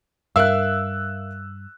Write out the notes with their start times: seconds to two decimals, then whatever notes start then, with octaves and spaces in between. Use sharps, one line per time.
0.36 G2 A#4 E5 F5 E6 F#6